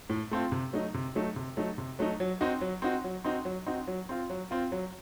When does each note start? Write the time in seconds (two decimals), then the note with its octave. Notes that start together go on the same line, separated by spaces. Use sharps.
0.10 A2
0.31 A3 C4 F4
0.52 C3
0.73 F#3 A3 D#4
0.94 C3
1.15 F#3 A3 D#4
1.36 C3
1.57 F#3 A3 D#4
1.78 C3
1.99 F#3 A3 D#4
2.20 F#3
2.41 C4 D#4 F#4
2.61 F#3
2.82 C4 D#4 F#4
3.04 F#3
3.25 C4 D#4 F#4
3.45 F#3
3.66 C4 D#4 F#4
3.87 F#3
4.09 C4 F4
4.30 F#3
4.51 C4 F4
4.72 F#3